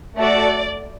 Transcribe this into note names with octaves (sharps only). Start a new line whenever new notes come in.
A3 F#4 A4 D5